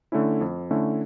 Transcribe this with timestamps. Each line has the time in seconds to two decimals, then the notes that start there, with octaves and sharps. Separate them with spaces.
0.12 D3 A3 C#4 E4
0.41 F2
0.71 D3 A3 C#4 E4